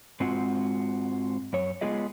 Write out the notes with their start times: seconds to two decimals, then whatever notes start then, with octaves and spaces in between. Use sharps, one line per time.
0.20 G#2 G#3 C4 F4 F#4
1.53 F#2 C#5
1.81 G#3 B3 F4 G#4 D#5